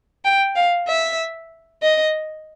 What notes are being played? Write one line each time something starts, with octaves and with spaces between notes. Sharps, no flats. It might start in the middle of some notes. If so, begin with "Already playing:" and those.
G5
F5
E5
D#5